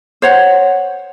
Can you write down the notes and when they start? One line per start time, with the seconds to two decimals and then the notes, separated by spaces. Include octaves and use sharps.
0.22 C5 C#5 F#5